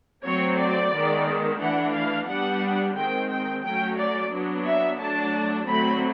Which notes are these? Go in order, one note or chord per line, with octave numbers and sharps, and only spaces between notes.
F#3 A3 C4 C#5
D5
D#3 G#3 B3
E3 A3 D4 F#5
F5
G3 B3 D4 F#5
D#3 G#3 C4 G5
G5
F#3 A3 C#4 G5
D5
F#3 B3 D4
E5
F#3 A3 D4 A5
D3 F#3 A3 C4 B5